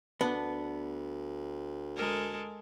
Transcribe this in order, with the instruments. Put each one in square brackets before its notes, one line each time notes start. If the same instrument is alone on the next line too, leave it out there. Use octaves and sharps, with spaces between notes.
[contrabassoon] D2 [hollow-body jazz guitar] B3 [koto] D4
[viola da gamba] G#3 A4 A#4